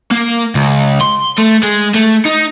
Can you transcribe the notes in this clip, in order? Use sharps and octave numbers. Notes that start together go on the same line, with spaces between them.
A#3
C#2
C6
A3
G#3
A3
D#4